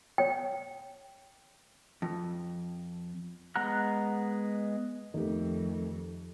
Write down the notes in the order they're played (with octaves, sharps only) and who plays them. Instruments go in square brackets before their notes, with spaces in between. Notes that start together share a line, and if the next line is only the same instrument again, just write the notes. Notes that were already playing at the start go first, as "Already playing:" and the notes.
[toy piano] C#5 G5
[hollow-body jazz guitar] F2
[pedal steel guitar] G#3 B3 F#5 A#5 F#6
[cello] F2 [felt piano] D#3 A3 G4